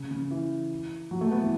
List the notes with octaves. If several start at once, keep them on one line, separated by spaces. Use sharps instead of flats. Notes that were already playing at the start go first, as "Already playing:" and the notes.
Already playing: C#3
C#3
E3
F#3
A3
B3
E3